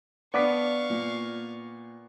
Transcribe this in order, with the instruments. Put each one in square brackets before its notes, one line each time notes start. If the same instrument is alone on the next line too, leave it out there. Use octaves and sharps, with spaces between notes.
[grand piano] B3 D6 B6 [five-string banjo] D4 D5 [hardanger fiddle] F5 C#6
[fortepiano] A#2